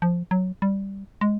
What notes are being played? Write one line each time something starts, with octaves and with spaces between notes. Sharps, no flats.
F3
F#3
G3
G#3